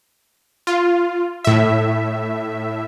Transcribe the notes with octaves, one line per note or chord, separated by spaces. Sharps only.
F4
A2 E5